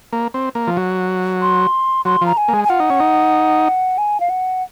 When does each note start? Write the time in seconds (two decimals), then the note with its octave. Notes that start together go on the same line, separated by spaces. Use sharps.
0.13 A#3
0.34 C4
0.55 A#3
0.67 F3
0.77 F#3
1.42 C6
2.05 F#3 C6
2.21 F3 A#5
2.37 G#5
2.48 A#3
2.53 G#3
2.64 G#5
2.69 F4 F#5
2.80 D#4
2.90 C#4
3.00 D#4
3.98 G#5
4.20 F5
4.30 F#5